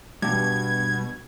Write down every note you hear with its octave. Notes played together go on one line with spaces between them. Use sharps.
G2 B2 G#6